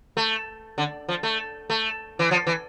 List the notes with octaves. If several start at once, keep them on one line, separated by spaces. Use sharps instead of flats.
A3
D3
F3
A3
A3
E3
F3
E3